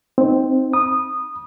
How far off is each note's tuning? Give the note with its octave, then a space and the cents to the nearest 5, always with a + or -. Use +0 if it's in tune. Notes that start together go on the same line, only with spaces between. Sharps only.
C4 +0 D#4 +0
B5 -25 D#6 -15